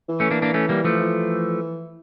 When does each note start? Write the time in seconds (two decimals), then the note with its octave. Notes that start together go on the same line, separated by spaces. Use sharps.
0.09 E3
0.20 A3 C#4
0.31 A#3 D4
0.42 A#3 D4
0.54 A3 C#4
0.69 G3 A#3
0.84 F3 A3
1.00 E3